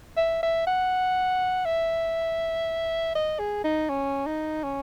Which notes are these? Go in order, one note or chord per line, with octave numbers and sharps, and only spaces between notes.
E5
E5
F#5
E5
D#5
G#4
D#4
C#4
D#4
C#4